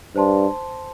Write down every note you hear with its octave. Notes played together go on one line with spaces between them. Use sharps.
G2 C5 A5 C6